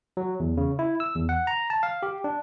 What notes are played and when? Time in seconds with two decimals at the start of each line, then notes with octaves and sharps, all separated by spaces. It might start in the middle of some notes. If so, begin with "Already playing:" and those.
0.17 F#3
0.40 E2
0.57 C#3
0.79 E4
1.00 E6
1.15 E2
1.29 F#5
1.47 A#5
1.70 A5
1.83 F5
2.03 G4
2.24 D4